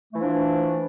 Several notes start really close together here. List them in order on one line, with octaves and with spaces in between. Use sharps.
A3 E3 F3 D4